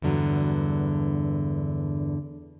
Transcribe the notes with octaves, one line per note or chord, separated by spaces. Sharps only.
E2 G2 D3 F#3